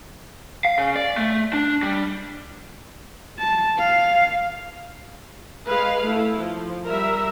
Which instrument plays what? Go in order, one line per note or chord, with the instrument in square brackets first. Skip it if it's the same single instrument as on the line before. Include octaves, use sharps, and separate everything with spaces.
[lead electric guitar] F5
C#3
D5
A3
D4
G3
[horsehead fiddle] A5
F5
[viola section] G#3 B4 F5
A3 E4
F3
G3 A#4 E5